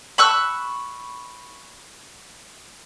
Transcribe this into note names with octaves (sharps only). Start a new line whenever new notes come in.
B5 C#6 E6 F#6